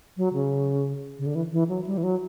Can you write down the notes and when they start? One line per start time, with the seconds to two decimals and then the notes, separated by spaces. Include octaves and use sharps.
0.17 F#3
0.34 C#3
1.19 C#3
1.26 D3
1.35 E3
1.52 E3
1.69 F#3
1.86 G3
1.98 E3
2.03 F#3